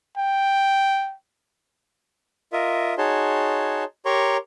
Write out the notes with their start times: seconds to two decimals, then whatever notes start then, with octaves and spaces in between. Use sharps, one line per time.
0.17 G5
2.53 F4 A#4 D#5 E5
2.98 D#4 F#4 G#4 C#5 A5 C6
4.05 G4 A#4 C#5 A#5 C6 C#6